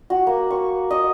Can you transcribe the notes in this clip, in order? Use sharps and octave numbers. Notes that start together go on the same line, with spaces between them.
F#4
A#3
C#6
D#5